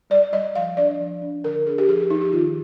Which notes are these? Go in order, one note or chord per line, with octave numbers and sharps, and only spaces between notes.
G3 D5
G3 D#5
F3 F5
D4 D5
F3
D4
D3 A#4
D4 G#4
G4
F3 G#4
G4
F3 D#4
G4
D#3 F4